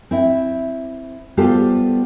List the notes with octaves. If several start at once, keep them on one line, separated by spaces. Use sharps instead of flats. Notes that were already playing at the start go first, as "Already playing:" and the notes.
C4 E4
G3 B3 F4 G4 A4 C5